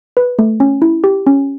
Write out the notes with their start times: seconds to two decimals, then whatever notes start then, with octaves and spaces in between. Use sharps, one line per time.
0.17 B4
0.39 A3
0.60 C#4
0.82 E4
1.04 G4
1.27 C#4